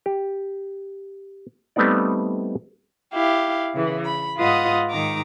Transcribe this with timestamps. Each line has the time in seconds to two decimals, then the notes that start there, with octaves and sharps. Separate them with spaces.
0.06 G4
1.76 G3 A3 B3 C4 D#4 D5
3.14 E4 G4 F5
3.73 C#3 E3
4.04 B5
4.38 G#2 F4 B4 D#5 F#5 D#6
4.89 G#2 D#3 D#4 A#5 D6